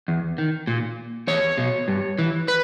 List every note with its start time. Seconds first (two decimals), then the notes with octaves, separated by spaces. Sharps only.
0.08 E2
0.38 D#3
0.67 A#2
1.27 E2 C#5
1.57 B2
1.88 G2
2.18 E3
2.48 B4